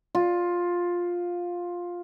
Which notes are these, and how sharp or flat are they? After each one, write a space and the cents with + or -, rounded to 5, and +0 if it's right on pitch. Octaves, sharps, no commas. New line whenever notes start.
F4 +10